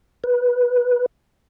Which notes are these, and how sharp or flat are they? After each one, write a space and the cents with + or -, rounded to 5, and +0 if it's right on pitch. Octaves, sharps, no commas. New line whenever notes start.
B4 -10